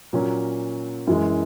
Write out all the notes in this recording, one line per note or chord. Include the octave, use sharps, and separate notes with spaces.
A#2 F#3 A#3 C#4
F#2 E3 G#3